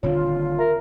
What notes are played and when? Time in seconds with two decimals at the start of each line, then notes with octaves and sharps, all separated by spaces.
0.03 D#1 D3 C4 F4 C#5
0.58 A#4 E5 A#5